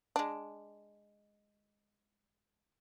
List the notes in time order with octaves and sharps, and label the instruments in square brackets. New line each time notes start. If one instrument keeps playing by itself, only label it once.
[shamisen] G#3 D4